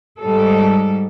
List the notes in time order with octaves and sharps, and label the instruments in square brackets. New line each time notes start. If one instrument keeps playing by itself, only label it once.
[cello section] G#2 G3 A4